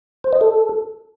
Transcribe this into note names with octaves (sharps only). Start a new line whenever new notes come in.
C5
D#5
A4